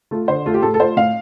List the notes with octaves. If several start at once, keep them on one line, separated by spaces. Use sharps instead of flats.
A3 F4
D3 C5
A3 F4
G4
A2 A4
A4
A3 F4 C5
A2 F5